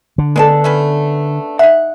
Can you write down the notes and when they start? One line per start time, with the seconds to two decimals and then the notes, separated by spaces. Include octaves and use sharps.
0.18 D3
0.36 G#3 B3 D4 A4 D5 A5
0.64 A3 C#4 B4
1.59 D#4 E5 F#5